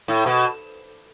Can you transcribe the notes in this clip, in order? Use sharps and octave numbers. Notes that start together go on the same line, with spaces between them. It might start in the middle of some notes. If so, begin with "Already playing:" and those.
A2
B2